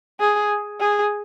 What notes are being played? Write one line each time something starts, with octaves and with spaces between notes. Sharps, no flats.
G#4
G#4